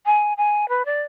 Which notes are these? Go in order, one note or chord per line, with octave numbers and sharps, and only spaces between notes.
G#5
G#5
B4
D5